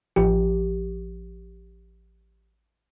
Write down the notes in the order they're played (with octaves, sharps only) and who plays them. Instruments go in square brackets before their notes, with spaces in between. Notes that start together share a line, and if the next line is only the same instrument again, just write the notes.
[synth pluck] A1 F3 G4